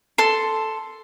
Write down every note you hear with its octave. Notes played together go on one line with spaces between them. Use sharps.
A4 C6